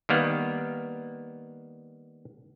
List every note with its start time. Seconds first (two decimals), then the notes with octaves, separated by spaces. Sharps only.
0.09 D#3 G3 A#3 B3